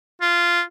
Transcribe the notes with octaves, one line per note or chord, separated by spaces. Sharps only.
F4